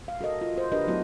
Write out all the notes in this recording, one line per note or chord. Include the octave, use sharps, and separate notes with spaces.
F5
F#4 A4 A#4 D#5
F4
C5
D4 G4 A#4 B4 D#5
F#3 A3 B3 E4 F#4